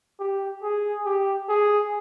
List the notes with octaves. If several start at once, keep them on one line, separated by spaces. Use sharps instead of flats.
G4
G#4
G4
G#4